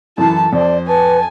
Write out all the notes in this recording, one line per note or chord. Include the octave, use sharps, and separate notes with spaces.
F#2 E3 E4 A4 A5
F2 C5 D5
B4 G#5 A5